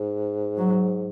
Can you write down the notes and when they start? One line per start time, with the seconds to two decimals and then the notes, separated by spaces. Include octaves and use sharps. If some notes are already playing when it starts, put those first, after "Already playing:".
Already playing: G#2
0.57 F#3